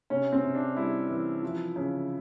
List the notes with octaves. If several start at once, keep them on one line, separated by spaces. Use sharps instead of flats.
C3 C#4
C4
C3
D4
G3 E4
E3
F3
C#3